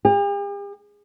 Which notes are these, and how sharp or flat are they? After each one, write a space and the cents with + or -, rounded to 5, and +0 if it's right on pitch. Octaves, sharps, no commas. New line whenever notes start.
G4 +45